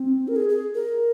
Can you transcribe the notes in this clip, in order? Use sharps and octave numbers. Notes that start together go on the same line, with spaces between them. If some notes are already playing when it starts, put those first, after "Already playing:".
Already playing: C4
A#4
G#4
G#4
A#4